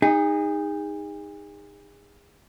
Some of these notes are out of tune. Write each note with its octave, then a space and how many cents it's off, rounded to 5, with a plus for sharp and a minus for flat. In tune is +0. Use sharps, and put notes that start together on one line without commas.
D#4 +0 G#4 -35